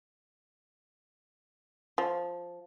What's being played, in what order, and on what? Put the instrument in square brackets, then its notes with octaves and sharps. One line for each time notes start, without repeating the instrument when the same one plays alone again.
[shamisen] F3